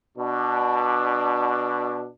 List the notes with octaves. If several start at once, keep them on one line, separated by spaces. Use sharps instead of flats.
B2 D4